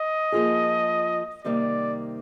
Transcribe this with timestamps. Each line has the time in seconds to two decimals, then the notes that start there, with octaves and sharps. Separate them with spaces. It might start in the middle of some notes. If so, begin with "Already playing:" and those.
Already playing: D#5
0.32 F3 A#3 F4 G#4
1.44 C3 D#3 G3 A#3 D5